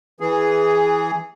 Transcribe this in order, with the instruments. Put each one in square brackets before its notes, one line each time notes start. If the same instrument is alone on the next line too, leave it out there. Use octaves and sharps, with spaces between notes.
[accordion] E3 G#4